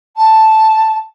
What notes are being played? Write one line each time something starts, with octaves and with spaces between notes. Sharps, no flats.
A5